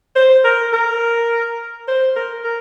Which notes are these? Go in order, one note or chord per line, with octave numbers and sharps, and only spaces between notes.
C5
A#4
A#4
C5
A#4
A#4